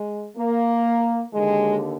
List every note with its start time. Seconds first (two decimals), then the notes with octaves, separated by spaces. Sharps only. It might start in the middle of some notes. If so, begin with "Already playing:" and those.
Already playing: G#3
0.37 A#3
1.33 D#2 D3 G#3